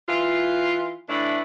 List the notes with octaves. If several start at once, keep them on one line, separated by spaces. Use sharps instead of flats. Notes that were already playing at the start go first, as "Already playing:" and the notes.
E3 F4
A2 E3 A3 D4 E4